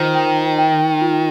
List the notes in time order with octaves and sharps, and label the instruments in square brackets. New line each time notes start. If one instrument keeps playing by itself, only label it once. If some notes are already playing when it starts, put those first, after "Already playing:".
Already playing: [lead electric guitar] D#3 [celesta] F4 C5
[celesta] G5
G5
F4